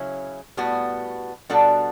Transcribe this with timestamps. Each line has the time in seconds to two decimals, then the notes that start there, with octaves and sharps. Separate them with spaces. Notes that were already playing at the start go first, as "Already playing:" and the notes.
Already playing: C#3 F#3 C#4 E4
0.57 A2 G3 B3 F#4
1.49 B2 G3 D4 F#4 A4